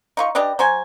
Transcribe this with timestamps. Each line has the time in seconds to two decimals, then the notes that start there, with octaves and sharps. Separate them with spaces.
0.17 D#4 F4 C#6
0.35 D4 G4 B4 D#5
0.59 F#3 C5 G#5